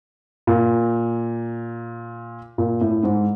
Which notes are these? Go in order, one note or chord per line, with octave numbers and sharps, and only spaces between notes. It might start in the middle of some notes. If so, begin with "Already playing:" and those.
A#2
A#2
A2
G#2